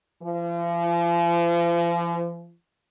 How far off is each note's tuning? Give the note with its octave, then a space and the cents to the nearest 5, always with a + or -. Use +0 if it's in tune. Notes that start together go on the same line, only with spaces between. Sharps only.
F3 -40